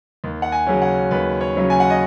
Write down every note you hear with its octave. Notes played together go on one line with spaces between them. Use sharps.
D#2
F#5
G#5
C#3 F#3 C#4
F#5
D#2 B4
C#5
C#3 F#3 C#4
G#5
F#5
D#5